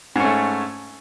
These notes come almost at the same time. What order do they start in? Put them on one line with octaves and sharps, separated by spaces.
G#2 C#4 A3